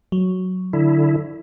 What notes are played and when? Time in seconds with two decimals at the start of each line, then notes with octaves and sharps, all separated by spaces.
0.12 F#3
0.73 D3 E4